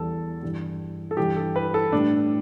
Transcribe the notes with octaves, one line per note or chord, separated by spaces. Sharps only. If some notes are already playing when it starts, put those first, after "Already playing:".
Already playing: E2 E3 G3 A4
G2 E3 G3
A4
G2 E3 G3 G4
A4
B4
A4
A2 G3 D4